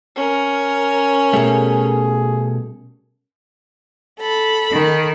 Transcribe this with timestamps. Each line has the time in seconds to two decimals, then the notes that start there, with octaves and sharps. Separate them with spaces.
0.16 C#4 A#4
1.33 B2 G3 A3 G#4
4.19 A4 B5
4.71 D#3